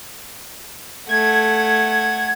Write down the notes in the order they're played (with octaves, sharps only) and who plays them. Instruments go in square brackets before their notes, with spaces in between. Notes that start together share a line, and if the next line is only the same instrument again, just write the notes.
[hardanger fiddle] A3 F#5 [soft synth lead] G#6